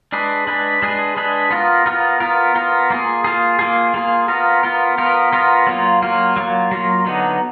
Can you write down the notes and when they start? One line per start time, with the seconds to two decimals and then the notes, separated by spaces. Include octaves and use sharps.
0.12 G#3 D4 G#4 B4
0.47 G#3 D4 G#4 B4
0.82 G#3 D4 G#4 B4
1.17 G#3 D4 G#4 B4
1.51 B3 F4 A#4
1.86 B3 F4 A#4
2.20 B3 F4 A#4
2.55 B3 F4 A#4
2.90 A#3 F4 G#4
3.24 A#3 F4 G#4
3.59 A#3 F4 G#4
3.94 A#3 F4 G#4
4.28 B3 F4 A#4
4.63 B3 F4 A#4
4.98 B3 F4 A#4
5.32 B3 F4 A#4
5.67 F#3 A#3 F4
6.02 F#3 A#3 F4
6.36 F#3 A#3 F4
6.71 F#3 A#3 F4
7.06 D3 F#3 B3 D#4